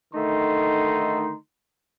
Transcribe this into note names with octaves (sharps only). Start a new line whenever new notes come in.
D3 D#3 A3 D#4 A#5 C6